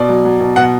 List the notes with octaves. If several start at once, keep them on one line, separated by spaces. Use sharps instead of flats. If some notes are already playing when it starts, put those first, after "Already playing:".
Already playing: B2 D5
F#3
F#3
B2
B2 F#5